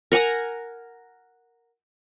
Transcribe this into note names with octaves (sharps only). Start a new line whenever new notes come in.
A#4 F#5 G#5 A#5